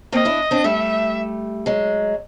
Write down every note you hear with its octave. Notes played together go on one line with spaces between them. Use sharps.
A#3 C4 D#5
D4 E4
C4 D4
G3 A3 E5
F#3 G#3